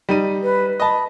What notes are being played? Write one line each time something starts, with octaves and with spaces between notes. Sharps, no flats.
G3 D#4 D#7
B4
D#5 A5 B5